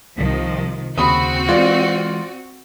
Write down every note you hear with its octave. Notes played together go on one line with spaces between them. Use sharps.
C2 D#3 F3
D#2 C#3 C4 F#4 B5 D#6
E3 G#3 F4 D5